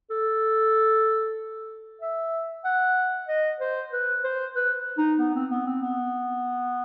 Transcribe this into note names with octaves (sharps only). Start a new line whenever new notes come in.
A4
E5
F#5
D#5
C5
B4
C5
B4
D#4
B3
C4
B3
C4
B3